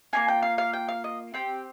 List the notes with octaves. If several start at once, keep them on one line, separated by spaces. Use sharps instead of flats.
A#3 C#4 F4 G#5
G5
F5
F5
G5
F5
D#5
C4 G4 G5